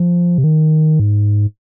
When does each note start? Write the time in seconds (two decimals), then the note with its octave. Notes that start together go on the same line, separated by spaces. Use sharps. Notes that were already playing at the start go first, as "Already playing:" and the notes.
Already playing: F3
0.38 C3
0.44 D#3
1.00 G#2